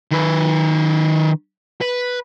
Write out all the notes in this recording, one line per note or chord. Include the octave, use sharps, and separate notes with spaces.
D#3 B4
B4